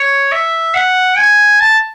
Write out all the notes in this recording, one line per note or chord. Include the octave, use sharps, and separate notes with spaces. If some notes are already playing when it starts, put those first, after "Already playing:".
Already playing: C#5
E5
F#5
G#5
A5